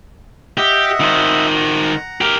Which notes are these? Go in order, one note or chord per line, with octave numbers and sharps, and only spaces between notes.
G4 D#5 E5 F#5
D#3 C5
F#5 A#5
G4 A#4